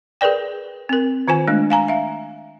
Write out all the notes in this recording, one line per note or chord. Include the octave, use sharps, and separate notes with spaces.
G#4 A#4 B4 D5 G5
C4 A#4
D#3 F4 C5 G#5
G#3 A3 D4
F5 G#5 A#5
E5 F5